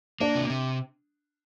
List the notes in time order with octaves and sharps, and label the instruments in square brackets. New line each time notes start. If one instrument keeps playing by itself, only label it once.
[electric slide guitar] A#3 [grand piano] D4
[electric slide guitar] C3
C3